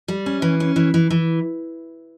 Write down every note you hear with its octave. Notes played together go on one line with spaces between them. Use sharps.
G3
C#4
E3
C#4
E3
E3
E3